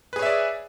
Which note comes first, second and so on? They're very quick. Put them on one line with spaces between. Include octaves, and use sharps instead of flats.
B4 G#4 C#5 E5 D5